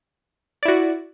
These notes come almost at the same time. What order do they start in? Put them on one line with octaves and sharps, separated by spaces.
D5 E4 F#4